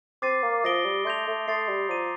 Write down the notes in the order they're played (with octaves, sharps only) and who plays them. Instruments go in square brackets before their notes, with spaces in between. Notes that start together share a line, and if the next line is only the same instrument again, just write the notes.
[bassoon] C4 [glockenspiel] D6 A6 C7 D#7
[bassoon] A#3
[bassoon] F3 [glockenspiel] D#6 A#6 D7 G7
[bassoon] G3
[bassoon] A3 [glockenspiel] C6 G6 A#6 F7
[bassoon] A3
[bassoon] A3 [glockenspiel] C6 D#6 A6 C7
[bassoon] G3
[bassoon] F3 [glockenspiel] A#5 D6 A6 D#7